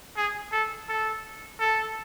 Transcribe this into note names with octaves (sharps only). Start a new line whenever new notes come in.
G#4
A4
A4
A4